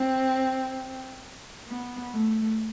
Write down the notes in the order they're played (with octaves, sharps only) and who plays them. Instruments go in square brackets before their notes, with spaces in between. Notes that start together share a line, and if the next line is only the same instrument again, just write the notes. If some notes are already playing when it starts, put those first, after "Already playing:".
Already playing: [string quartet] C4
B3
A3